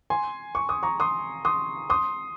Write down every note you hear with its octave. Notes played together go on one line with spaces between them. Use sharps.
G#5 C6
C#6
D#6
A#5 C#6
C6 D#6
C6 D#6
C6 D#6